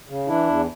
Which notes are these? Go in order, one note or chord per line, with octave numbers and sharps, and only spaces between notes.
C#3
E3 D4 E4
E2